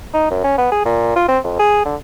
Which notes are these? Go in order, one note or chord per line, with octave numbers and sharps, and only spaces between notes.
D#4
F#2
C#4
B3
G#4
A#2
F4
C4
F2
G#4
D3